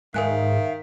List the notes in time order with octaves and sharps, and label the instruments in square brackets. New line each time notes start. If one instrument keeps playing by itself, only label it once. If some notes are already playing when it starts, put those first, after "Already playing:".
[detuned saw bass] G#2 [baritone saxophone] D#3 [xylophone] A#4 G#5 F#6 [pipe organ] E5 F5